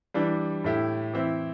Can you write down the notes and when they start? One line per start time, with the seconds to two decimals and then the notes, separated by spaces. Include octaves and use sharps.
0.14 E3 G3 D4
0.64 A2 A3 E4 G4
1.13 E3 C4 E4